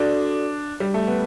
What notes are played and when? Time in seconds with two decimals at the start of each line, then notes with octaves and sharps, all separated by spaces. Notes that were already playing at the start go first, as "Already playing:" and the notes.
Already playing: D4 F#4 A4 D5
0.80 G3
0.94 A3
1.08 B3